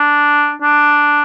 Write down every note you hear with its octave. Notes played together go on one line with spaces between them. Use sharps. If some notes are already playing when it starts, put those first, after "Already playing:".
Already playing: D4
D4